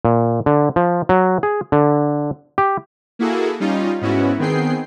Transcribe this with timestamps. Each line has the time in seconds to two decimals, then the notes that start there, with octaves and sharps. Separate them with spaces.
0.05 A#2
0.46 D3
0.76 F3
1.09 F#3
1.43 G#4
1.72 D3
2.58 G4
3.19 A#3 E4 F#4 G#4 A4
3.60 G3 C#4 D#4 F4
4.01 G#2 B3 C#4 E4 F#4
4.39 D#3 B3 C4 G#4 G5 C7